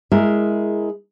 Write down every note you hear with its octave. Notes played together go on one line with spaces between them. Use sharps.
G#3 E4 G#4 A#4